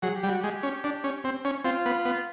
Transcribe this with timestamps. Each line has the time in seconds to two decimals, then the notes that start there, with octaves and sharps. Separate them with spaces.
0.03 F#3 G#4
0.16 G4
0.23 G3
0.28 F#4
0.41 G#3 G4
0.63 C#4
0.84 D4
1.04 C#4
1.24 C4
1.45 C#4
1.64 C4 F4
1.86 B3
2.05 B3